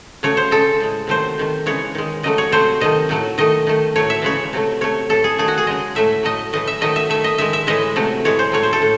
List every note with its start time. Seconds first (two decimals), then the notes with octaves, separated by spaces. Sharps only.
0.23 C#3 F#3 A3 C#5
0.37 C5
0.51 C#3 G#3 A4
0.80 A2 G#3
1.07 C3 D#3 F#3 A3 C5
1.38 C3 D#3 A3
1.66 C#3 E3 G#3 C#5
1.95 D#3 G#3
2.23 C#3 F#3 A3 D#5
2.38 C#5
2.52 C3 F#3 A3 C5
2.80 C3 D#3 A3 D#5
3.09 A2 F#3 A3
3.38 D#3 A3 D#5
3.67 D#3 A3
3.96 A2 F#3 A3 C#5
4.10 E5
4.22 C#3 E3 G#3 C#5
4.53 C3 F#3 A3
4.81 C3 F#3 A3 C#5
5.09 A2 E3 A3 A4
5.24 G#4
5.38 D#3 F#3 A3 G#4
5.48 F#4
5.58 G#4
5.67 C#3 G#3 D#5
5.95 A2 F#3 A3 E5
6.23 A2 F#3 A3 D#5
6.53 A2 E3 A3 D#5
6.67 E5
6.81 D#3 F#3 A3 D#5
6.96 E5
7.10 D#3 A3 E5
7.24 D#5
7.38 D#3 G#3 E5
7.53 E5
7.67 A2 E3 G#3 D#5
7.96 C3 F#3 A3
8.25 A2 E3 G#3 C#5
8.39 C5
8.52 A2 F#3 A3 C#5
8.63 C5
8.73 A4
8.82 A2